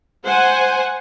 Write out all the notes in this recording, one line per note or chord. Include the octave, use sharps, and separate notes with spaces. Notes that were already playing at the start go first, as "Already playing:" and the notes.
C5 F#5 G#5